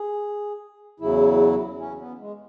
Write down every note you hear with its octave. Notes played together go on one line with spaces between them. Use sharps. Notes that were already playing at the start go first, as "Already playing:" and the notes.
Already playing: G#4
E2 C#3 F#3 E4
C#4
B3
G#3